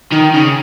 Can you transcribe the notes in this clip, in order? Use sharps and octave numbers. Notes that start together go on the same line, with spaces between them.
D#3
C#3